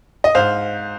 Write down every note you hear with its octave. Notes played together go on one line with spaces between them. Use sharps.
D#5
G#2 C5 F5